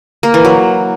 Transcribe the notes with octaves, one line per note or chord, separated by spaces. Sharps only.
A#3
E3
F#3